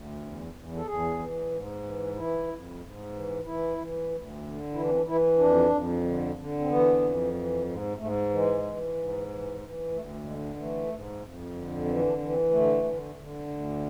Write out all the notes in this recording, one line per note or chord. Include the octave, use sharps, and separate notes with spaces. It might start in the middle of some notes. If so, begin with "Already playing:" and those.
Already playing: D2
E2
E2
A4
E2 G#4
E3
G#2
E3
E3 E4
F2
G#2
E3
E3 E4
E3
D2
D3
E3 E4
D4
C4
D4
E3 E4
F2 D4
F2
D3
D3
C4
E3 B3
F2
E3
G#2
G#2 A3
E3 G#3
E3
G#2
E3
E3
D2 A3
D3 G#3
E3 A3
G#2
F2
D3
E3 C4
D4
E3
C4
D3 A3
D3
D3
D2